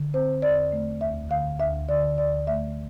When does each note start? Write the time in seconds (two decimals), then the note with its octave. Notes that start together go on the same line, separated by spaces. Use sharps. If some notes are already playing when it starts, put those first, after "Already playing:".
Already playing: D3
0.14 C4 C5
0.42 E2 D5
0.72 A3
1.01 D2 E5
1.30 D3 F5
1.59 D2 E5
1.89 D3 D5
2.18 D2 D5
2.47 A3 E5